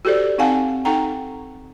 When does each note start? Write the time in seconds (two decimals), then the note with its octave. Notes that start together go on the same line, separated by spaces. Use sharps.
0.05 F#4 G4 A4 C5 D5
0.38 C4 D#4 F5 F#5 G#5 A5
0.85 D#4 A4 F#5 G5 A#5